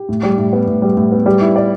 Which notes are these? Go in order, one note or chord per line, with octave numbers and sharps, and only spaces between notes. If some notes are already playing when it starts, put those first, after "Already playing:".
Already playing: G4
A2
G3
A2
B3
A2
G3
A2
B3
G3
E4
D5